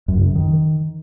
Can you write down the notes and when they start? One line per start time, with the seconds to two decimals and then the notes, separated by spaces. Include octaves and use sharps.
0.08 F#2
0.17 C#3
0.26 F#2
0.35 D#3